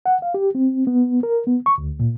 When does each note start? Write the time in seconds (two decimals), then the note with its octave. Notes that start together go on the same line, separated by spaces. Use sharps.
0.06 F#5
0.22 F5
0.34 G4
0.55 C4
0.87 B3
1.23 A#4
1.47 B3
1.66 C#6
1.78 D2
2.00 A#2